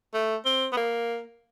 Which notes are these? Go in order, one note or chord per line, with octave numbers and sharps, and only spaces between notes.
A3
C4
B3
A#3